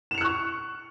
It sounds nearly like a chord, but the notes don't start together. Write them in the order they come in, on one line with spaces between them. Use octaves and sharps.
E7 F7 C#7 F#6 C#6